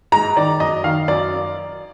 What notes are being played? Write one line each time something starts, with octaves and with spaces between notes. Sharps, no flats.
G#2 A#5
D#3 D5
F#2 D#5
D#3 F5
F#2 D5